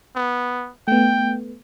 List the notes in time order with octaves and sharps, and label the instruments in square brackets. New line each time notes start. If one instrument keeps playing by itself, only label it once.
[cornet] B3
[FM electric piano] A3 B3 [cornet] G5